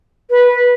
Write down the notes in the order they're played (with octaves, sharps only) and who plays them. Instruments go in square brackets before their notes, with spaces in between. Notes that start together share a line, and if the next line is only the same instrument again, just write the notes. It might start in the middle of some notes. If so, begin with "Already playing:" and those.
[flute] B4